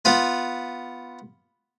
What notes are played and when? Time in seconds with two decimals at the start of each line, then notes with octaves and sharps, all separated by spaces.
0.05 B3 F4 B4